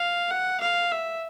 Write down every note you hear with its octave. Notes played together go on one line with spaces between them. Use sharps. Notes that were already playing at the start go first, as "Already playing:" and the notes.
Already playing: F5
F#5
F5
E5